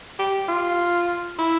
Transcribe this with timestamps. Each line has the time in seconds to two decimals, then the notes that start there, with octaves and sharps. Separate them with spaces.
0.19 G4
0.49 F4
1.39 E4